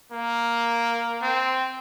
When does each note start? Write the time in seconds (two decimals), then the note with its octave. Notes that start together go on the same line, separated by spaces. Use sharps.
0.11 A#3
1.23 C4